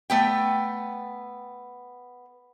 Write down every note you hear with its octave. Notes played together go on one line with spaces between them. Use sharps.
A3 B3 G5